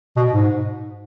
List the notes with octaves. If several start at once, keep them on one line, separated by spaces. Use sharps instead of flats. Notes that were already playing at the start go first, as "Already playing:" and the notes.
B2
G#2